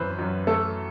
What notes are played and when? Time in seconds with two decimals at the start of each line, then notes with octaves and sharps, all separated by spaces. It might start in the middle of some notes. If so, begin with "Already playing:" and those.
Already playing: F#2 E3 B4 C5
0.19 F#2
0.47 A3 A4